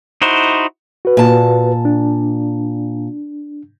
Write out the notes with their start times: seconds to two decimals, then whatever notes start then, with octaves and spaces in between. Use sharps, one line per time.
0.22 D#4 E4 F#4 C5
1.05 F#4 B4
1.17 A#2 A5
1.85 D4